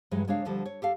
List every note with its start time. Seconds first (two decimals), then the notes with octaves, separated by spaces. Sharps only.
0.11 G2 E3 F#3 G#3
0.27 C#3 G#3 A#3 D4 C#5 F5
0.45 D2 D3 F3 G3
0.66 C#5
0.82 G4 A4 F5